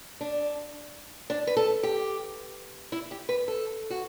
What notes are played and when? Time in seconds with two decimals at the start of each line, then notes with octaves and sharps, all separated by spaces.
0.21 D4
1.30 D4
1.47 B4
1.57 A4
1.83 G4
2.92 E4
3.11 G4
3.29 B4
3.48 A4
3.90 F#4